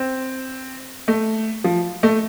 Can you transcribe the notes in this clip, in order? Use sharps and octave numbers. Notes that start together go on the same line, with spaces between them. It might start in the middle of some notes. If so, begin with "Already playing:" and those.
Already playing: C4
A3
F3
A3